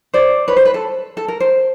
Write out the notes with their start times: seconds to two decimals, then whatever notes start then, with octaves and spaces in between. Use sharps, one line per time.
0.14 C5 D5
0.48 B4 C#5
0.56 C5
0.65 B4
0.74 A4
1.17 A4
1.28 A#4
1.40 C5